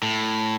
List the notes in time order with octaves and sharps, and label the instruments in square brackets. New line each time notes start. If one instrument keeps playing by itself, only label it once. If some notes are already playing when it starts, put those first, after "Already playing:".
[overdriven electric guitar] A2